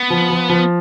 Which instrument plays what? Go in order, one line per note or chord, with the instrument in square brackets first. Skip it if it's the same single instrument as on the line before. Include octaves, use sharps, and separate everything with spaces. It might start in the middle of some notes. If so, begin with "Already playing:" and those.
Already playing: [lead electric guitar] B3
[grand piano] F3
F3
F3